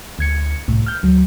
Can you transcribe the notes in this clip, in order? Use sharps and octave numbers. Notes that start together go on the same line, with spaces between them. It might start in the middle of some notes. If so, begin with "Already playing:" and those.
D2 G#6 C#7
C2 A2
F6 G6
D2 F#3